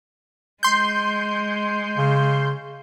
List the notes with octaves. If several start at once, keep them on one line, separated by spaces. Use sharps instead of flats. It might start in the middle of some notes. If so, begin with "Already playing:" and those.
G#3 C6 G6
C#3